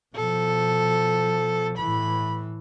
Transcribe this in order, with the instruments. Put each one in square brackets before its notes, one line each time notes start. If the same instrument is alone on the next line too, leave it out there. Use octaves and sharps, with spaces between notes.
[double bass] B2 F3 [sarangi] A4
[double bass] A2 E3 [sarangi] B5